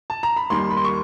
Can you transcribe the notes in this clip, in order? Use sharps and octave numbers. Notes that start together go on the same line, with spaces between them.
A5
A#5
B5
D#2 D#3 G3 A#3 C6
B5
C6
C#6